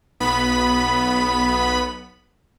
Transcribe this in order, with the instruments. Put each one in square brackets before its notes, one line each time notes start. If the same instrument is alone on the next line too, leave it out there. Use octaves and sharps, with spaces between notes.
[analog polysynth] B1 B3 B5 B6